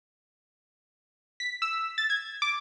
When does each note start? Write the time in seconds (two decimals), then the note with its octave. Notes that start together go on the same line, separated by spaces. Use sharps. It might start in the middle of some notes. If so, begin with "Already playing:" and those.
1.40 B6
1.62 E6
1.98 A6
2.10 G#6
2.42 D6